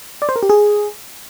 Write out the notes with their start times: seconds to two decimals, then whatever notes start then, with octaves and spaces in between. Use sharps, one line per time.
0.22 D5
0.29 C5
0.36 A#4
0.43 G4
0.50 G#4